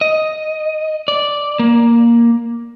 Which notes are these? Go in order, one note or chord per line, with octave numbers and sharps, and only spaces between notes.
D#5
D5
A#3